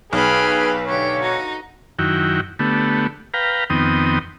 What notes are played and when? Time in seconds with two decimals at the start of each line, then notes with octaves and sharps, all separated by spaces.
0.13 B1 G#4 B4 G5 B5 F6
0.87 D3 G4 C#5
1.21 D#4 F#4
1.99 F#2 D#3 E4 F#4 G5
2.59 D3 A3 B3 G4
3.34 B4 F5 G5 A#5
3.70 F2 D#3 B3 C4 G5 D#6